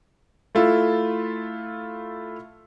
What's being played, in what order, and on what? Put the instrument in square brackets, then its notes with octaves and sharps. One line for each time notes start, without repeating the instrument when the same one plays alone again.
[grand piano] A3 E4 F4 A4